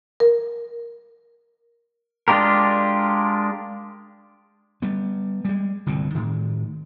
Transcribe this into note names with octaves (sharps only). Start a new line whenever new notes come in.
A#4
G#3 D4 F4 G4 A#4
G3 B3
G3 G#3
G1 C2 A#2 C4
A2 D#3